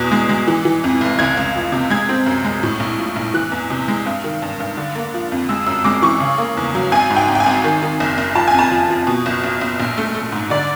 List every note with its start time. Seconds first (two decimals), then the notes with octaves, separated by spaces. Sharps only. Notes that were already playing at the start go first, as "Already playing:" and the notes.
Already playing: E2 B2 F#6
0.12 G#3
0.29 G#3
0.48 E3
0.65 E3
0.84 F2
1.01 F1
1.19 C#2 G#6
1.37 C#2
1.56 F3
1.72 C3
1.90 G#3 G#6
2.09 C4
2.26 F#2
2.45 G#3
2.63 A2
2.80 A#1
2.99 F3
3.16 A#1
3.34 E3 F#6
3.52 E2
3.70 C3
3.88 G#3
4.06 G2
4.24 D#3
4.42 G2
4.60 G2
4.77 D3
4.95 A#3
5.14 F3
5.32 F2
5.49 G#3 E6
5.66 F#2 E6
5.84 G#3 D6
6.02 E3 C#6
6.20 C#3
6.38 A#3
6.57 E2
6.75 F#3
6.92 G#1 G#5
7.10 G#2
7.16 G5
7.28 G#1
7.35 G5
7.40 G#5
7.46 G#1
7.64 D#3
7.83 D#3
8.00 F#1
8.18 F#1
8.35 F3 A5
8.48 G#5
8.53 F2
8.59 A5
8.71 F3
8.90 F3
9.07 B2
9.26 F#1
9.44 F#1
9.61 F#1
9.80 A#1
9.98 A3
10.15 A3
10.32 G#2
10.50 D3 D5